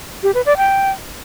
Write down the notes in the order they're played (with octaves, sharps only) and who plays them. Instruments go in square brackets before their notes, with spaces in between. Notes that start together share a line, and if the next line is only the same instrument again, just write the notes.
[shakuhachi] G4
B4
D5
G5